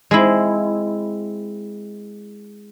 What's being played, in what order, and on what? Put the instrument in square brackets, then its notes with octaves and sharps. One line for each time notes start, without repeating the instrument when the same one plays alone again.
[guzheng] G#3 C4 E4